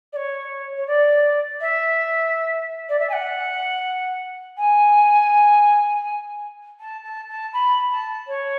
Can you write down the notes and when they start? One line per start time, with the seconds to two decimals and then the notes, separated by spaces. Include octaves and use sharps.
0.12 D5
0.16 C#5
0.77 C#5
0.87 D5
1.60 E5
2.89 D5
2.99 E5
3.09 G#5
3.12 F#5
4.57 G#5
6.79 A5
7.04 A5
7.29 A5
7.53 B5
7.90 A5
8.27 C#5